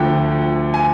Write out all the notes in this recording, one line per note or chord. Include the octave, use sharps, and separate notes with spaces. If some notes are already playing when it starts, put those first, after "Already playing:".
Already playing: D2 D3 F3 G5
G#5